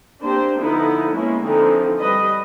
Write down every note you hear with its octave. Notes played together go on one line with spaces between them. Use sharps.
A#3 C4 D4 G4 C5
D3 F3 B3 D#4 E4 B4
G#3 A#3 B3 C#4 E4
D3 E3 F3 C4 D#4 A4
G3 B4 D#5